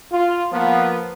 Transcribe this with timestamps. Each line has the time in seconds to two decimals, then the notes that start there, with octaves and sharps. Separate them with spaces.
0.12 F4
0.52 F3 A#3 B3